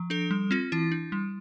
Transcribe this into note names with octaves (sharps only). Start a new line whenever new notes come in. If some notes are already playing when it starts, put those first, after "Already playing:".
Already playing: F3
D4 A4
G3
C4 F4
E3 E4
D4
G3